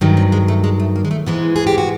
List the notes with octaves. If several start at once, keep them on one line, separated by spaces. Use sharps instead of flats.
G2 D#3 F#3 A3
C4
G#3
A3
G#3
A3
A#3
G#3
A3
G#2 E3 G#3 B3
G#4
G4
F#4